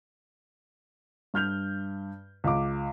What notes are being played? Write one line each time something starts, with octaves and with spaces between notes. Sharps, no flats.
G2 F6 G6 F7
C#2 D6